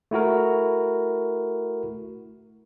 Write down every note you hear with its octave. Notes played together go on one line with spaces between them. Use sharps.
A3 E4 F#4 A#4